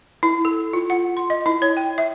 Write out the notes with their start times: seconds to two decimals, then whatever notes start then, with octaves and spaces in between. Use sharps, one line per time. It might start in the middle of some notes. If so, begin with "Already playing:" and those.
0.23 E4
0.45 A4
0.73 F4
0.90 F#5
1.17 C6
1.30 D#5
1.46 E4
1.62 C#5
1.77 G5
1.98 E5